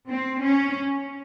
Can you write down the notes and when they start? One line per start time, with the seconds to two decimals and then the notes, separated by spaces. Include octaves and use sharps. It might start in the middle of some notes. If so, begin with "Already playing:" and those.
0.10 C4
0.42 C#4